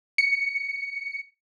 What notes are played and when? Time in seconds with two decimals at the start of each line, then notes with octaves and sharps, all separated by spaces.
0.18 C#7